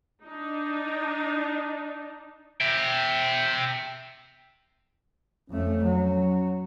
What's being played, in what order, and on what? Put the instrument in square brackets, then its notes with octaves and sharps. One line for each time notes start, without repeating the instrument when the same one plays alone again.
[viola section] D4 D#4
[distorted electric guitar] E5 G5
[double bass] F2 A3 [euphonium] C#4
[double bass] F#3